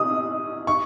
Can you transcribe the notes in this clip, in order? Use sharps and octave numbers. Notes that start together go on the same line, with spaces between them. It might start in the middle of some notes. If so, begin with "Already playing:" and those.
Already playing: D#6
C#6